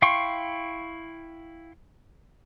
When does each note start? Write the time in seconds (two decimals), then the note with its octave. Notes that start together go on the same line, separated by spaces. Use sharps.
0.02 E4 F5 G5 C6 C#6